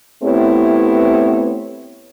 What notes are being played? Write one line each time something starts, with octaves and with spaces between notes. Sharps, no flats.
A3 B3 C4 E4 G4 C#5